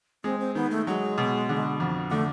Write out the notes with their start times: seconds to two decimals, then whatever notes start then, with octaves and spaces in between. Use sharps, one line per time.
0.24 G#3 C4
0.40 C4
0.55 D#3 B3
0.71 A3
0.87 F#3 G#3
1.18 B2
1.49 D3
1.80 F2
2.11 D3 A3